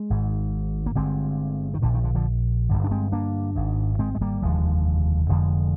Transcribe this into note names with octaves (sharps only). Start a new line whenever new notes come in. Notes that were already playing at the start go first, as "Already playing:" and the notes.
Already playing: G#3
G#1 G#2
A#3
G1 G2 D3 G#3 C4
D#3
A#1 A#2 D3
D#3
D3
D3 F3
G1 G2 D3
D4
G#3 C4
A#3 D4
G#1 G#2
G#3 C4
G#3
G3 A#3
F1 D#2 D3 F3 G#3
F1 F2 D3 F3 G#3